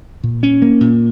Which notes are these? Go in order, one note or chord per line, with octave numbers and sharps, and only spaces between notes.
A#2
C#4
A#3
A#2